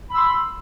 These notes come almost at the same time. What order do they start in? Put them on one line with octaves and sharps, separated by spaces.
B5 E6 C6